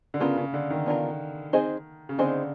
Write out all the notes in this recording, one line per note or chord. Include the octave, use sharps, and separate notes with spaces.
D3
C#3 B3 D4 F4 A#4
C#3
D3
D#3
B3 D4 F4 A#4
C4 D#4 G#4 C5 D#5
C#3
D3 C4 D#4 G#4 C5 D#5